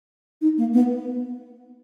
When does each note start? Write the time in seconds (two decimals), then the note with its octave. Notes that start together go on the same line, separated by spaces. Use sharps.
0.41 D#4
0.58 A#3
0.73 B3